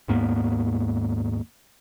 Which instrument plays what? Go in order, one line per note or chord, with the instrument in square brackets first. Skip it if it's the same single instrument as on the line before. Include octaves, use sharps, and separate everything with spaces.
[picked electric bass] D#2 G#2 A#3 B3